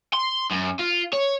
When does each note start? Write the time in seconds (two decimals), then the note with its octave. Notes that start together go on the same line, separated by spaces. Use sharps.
0.13 C6
0.51 F#2
0.79 F4
1.13 C#5